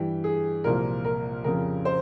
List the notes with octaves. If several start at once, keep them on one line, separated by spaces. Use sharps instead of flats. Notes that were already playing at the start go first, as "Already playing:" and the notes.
Already playing: G2 E3 G4
G#4
C2 A#2 F3 A#4
A#4
F2 C#3 F3 A#4
C5